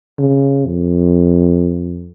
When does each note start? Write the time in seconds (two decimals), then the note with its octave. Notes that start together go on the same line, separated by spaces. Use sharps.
0.19 C#3
0.66 F2